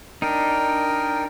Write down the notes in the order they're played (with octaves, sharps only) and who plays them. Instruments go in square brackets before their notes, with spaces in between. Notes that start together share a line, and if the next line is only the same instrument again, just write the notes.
[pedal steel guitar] D4 D#4 [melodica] A#4 G5